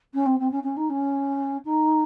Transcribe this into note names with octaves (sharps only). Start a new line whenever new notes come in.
C#4
C4
C4
C#4
C#4
D#4
C#4
D#4